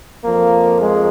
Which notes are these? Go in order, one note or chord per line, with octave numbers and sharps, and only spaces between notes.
F2 F3 A#3
G#3